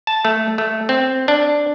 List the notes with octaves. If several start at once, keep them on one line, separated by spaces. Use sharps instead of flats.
A5
A3
A3
C4
D4